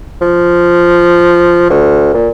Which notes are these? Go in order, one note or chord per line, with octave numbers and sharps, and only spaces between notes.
F3
D2
A#2